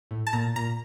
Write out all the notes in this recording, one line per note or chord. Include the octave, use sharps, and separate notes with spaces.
A2
A5
A#2 A#5
A#2 A#5